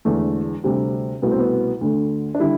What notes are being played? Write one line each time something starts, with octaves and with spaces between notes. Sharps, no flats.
E1 E2 D3 A3
D2 C3 G3
C2 B2 A3 B3
C4
B3
D2 D3 A3
D4
D3 G3 E4